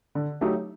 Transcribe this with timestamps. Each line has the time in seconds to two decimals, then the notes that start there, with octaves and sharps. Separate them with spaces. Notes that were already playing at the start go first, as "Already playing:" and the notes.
0.15 D3
0.41 F#3 A3 D#4 G4